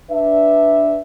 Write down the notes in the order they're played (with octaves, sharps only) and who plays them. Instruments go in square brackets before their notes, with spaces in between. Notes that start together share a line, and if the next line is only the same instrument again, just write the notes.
[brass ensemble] D4 B4 E5